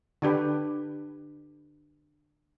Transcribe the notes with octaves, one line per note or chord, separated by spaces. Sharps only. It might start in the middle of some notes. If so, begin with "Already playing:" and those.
D3 D4 G4 B4